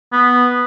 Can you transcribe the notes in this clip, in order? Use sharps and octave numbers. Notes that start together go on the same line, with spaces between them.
B3